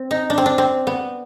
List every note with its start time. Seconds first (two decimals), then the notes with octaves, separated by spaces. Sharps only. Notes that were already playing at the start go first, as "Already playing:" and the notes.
Already playing: C4
0.11 D#4
0.30 D4
0.38 C4
0.46 D4
0.58 C4
0.87 B3